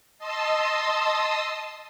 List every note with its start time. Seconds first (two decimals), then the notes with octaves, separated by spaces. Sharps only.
0.19 D#5 A5 C6 D#6 E6